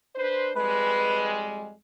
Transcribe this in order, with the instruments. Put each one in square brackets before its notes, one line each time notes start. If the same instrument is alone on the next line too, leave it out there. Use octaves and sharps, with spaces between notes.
[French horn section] D4 B4 C5
[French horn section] F2 G3 G#3 [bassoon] B4